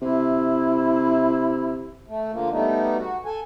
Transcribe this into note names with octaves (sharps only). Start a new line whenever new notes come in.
C3 E4
A3
D3 F3 A#3
G3 A3 B3 D#4
F#4
A4 G#5